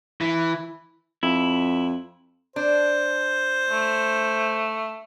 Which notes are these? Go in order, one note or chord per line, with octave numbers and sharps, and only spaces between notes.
E3
F2 E4
D4 C5
A3